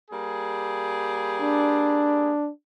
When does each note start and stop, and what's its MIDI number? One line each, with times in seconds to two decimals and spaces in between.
0.11 2.31 55
0.11 2.31 58
0.11 2.31 68
1.41 2.49 62